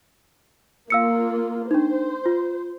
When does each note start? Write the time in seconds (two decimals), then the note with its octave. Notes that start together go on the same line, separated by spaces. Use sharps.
0.90 A#3 F4 F5 E6 C#7
1.71 D4 D#4 C5
2.26 F4